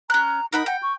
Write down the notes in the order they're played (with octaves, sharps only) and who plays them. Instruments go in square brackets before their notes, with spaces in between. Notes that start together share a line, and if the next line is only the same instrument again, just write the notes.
[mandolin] C#4 F#6 [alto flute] A#5
[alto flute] D#4 [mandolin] A#4 F#5 B5
[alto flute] F#5 [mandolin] G5
[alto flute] C#6